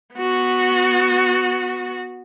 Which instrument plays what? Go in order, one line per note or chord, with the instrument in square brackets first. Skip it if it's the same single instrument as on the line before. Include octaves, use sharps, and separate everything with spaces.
[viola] B3 F#4